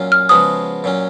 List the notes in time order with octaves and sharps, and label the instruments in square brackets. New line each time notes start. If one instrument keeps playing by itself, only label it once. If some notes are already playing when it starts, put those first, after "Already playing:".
Already playing: [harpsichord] A#2 F#3 C#4 F4
[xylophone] F6
[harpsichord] C#3 F3 G#3 B3 F#4 [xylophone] D#6
[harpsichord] A#2 F#3 C#4